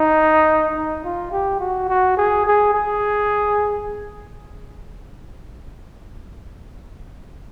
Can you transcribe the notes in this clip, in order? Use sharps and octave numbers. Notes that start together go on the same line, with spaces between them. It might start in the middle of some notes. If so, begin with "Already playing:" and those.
Already playing: D#4
D#4
F4
G4
F#4
F#4
G#4
G#4
G#4